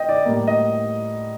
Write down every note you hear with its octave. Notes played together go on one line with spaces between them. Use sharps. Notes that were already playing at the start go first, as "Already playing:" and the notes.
Already playing: D#5 G5
D5
A2 G3 A#3
D#5